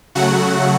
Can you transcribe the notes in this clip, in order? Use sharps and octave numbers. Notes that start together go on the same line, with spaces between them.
C#3 F#3 A3 F#4 F#5